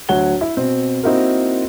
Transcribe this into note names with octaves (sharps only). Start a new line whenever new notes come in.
D2 F#3 C#5 F#5 G7
E4
B2 C4
A#3 C4 D#4 E4 F#4 A#4